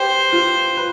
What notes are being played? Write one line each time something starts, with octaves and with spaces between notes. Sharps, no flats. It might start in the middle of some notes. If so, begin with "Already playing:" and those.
Already playing: G4 B4 C5
F4
B4